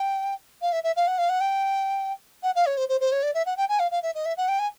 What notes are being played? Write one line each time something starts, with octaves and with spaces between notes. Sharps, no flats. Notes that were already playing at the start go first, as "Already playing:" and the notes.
Already playing: G5
F5
E5
E5
F5
F#5
F5
F#5
G5
F#5
F5
C#5
C5
C5
C5
C#5
D5
E5
F#5
G5
G#5
F5
F5
E5
D#5
E5
F#5
G5
G#5